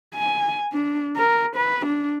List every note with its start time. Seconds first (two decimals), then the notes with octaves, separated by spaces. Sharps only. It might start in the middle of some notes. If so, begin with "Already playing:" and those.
0.14 G#5
0.73 D4
1.16 A#4
1.56 B4
1.86 D4